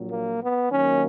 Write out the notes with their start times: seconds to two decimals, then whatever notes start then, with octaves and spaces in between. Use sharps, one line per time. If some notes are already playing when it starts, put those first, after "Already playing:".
Already playing: A#1 A#2 F#3
0.11 A#3
0.42 B3
0.71 D#2 D#3 F#3 A#3 C#4